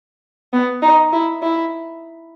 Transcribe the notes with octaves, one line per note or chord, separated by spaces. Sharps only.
B3
D#4
E4
E4